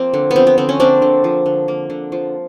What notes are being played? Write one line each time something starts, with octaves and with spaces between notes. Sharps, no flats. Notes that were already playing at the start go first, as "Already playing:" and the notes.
Already playing: F3 A#3 C4
D3
B3
F3 C4
B3
D3 C4
C#4
A#3 C4 D4
D3
F3
D3
A#3
D3
F3